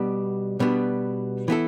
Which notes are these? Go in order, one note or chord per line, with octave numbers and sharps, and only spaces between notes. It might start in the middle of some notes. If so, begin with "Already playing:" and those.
Already playing: B2 G3 B3 D4
B2 G3 B3 D4
E3 B3 E4 A4